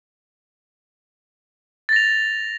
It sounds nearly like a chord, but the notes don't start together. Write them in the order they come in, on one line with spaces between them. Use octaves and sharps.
A6 A#6 F7